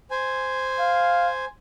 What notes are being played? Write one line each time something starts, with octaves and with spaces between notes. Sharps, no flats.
C5 G#5
F5